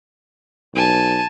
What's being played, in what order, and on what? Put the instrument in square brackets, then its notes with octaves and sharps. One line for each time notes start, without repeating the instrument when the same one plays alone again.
[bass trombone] B1 [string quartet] G#5 A5